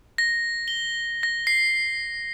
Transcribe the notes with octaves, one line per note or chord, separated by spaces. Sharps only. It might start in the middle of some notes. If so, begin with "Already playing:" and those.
A#6
G7
A#6
C7